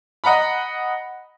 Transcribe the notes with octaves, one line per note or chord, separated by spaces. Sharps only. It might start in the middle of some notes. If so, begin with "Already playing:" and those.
D#5 F#5 A#5 B5